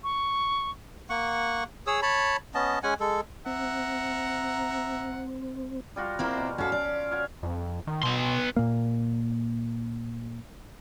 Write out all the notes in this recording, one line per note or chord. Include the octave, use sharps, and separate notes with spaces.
C#6
A#3 F#5 C#6
G#4 C#5 D#6 E6
C#5 A5 B5
B3 C#4 D#5 A5
G#3 C#4 F#5 G#5
G#3 A4
C4 E5 F#5 A#5
G3 F4 F#4
A#3 C4 E4 A#4 C5
B2
C#4 F#4 A4 F5
D5
F#4 C#5 F5
F2
D#3
B2 B3 C6
A#2 A#3